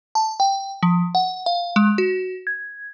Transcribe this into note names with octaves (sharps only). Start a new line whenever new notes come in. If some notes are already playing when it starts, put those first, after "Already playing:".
A5
G5
F3
F#5
F5
G#3
F#4
G#6